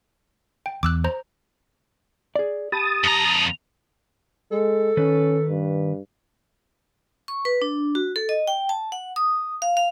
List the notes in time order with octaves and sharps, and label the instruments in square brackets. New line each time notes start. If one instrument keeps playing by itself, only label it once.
[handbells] G5
[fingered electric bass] E2 [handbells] D6 E6 F#6
[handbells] C5 A#5
[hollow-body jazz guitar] G#4 D5
[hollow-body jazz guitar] G4 B5 [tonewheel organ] A5 D#6
[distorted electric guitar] F2 A#5
[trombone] G#3 [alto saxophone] A4
[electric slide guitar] D#3 B4 [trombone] C#4
[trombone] G2
[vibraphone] C#6
B4
D4
F#4
A4
D#5
G5
A5
F#5
D#6
F5
F5